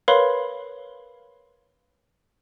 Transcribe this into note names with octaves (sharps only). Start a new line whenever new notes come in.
A#4 B4 C#5 F5 B5 C6